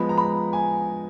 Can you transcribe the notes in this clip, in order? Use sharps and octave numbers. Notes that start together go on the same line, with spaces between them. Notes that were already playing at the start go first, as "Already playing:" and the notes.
Already playing: F3 G#3 B3 B5
A#5
B5
G#5